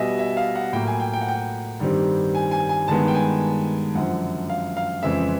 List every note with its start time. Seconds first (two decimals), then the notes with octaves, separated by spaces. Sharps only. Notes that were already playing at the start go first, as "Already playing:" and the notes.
Already playing: B2 G3 B3 D#5 E5 G#5
0.19 E5
0.37 F5
0.55 F#5
0.73 A2 F#3 A#3 G5
0.87 G#5
1.00 G5
1.13 G5
1.21 F#5
1.28 G5
1.80 G2 D#3 G3 C4
2.35 G#5
2.51 G#5
2.69 G#5
2.88 G2 D#3 G#3 B3 A5
3.08 G5
3.15 G#5
3.95 F#2 D3 F3 F#5
4.50 F5
4.77 F5
5.03 F2 C#3 E3 G#3 C4 E5